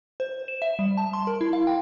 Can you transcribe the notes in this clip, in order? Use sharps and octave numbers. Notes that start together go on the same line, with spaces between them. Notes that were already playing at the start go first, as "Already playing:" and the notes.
C5
E7
E5
G3
A5
C6
A#4
E4
F5
G5